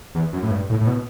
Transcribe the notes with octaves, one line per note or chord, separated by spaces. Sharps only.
E2
F#2
A2
G2
A2
A2
B2